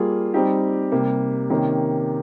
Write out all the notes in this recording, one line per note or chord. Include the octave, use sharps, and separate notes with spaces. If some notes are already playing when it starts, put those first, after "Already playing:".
Already playing: G3 A#3 F4 G#4
G3 C4 D#4 G4
C3 G3 A#3
C3 D#3 A#3 C#4